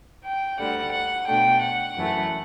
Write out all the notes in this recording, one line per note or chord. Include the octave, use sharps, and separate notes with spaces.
G5
D2 D3 G3 F#5
F#5
B2 A3 D4 G5
F#5
F#2 E3 A3